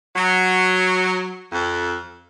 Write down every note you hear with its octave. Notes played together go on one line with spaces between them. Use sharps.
F#3
F2